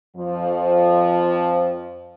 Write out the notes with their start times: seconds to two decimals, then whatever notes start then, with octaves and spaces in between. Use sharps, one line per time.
0.16 F2 F3